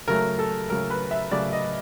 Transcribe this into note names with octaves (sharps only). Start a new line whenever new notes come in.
C#3 F#3 A3 A#4
A4
C#3 F#3 A3 A#4
B4
E5
C#3 F#3 A3 D5
D#5